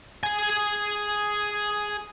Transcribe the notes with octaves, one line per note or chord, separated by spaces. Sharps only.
G#4 G#5